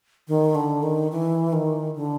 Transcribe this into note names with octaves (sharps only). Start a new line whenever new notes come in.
D#3
D3
D#3
E3
D#3
D3